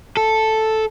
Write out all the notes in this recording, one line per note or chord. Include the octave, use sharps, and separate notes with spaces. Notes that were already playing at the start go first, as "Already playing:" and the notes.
A4